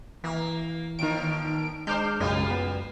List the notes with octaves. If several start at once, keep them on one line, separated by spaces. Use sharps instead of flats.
E3 A#3
D#2 D#3 F3 A#4 D7
G#3 D4 C5 D6 F6 G6
B1 F#2 C#3 G3 G#3 A#3 F4
B3